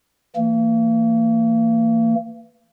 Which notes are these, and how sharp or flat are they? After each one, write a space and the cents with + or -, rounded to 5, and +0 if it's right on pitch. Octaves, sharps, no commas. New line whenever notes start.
E3 +0 A#3 -35